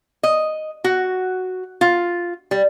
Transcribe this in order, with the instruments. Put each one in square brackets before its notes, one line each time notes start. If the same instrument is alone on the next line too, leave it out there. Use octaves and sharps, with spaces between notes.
[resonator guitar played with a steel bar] D#5
F#4
F4
G3